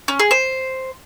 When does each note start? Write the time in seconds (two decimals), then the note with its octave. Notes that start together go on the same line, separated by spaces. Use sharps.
0.08 C#4
0.19 G#4
0.31 C5